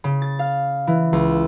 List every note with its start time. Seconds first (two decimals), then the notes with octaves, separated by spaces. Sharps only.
0.04 C#3
0.22 A6
0.39 F5
0.87 E3
1.13 C#2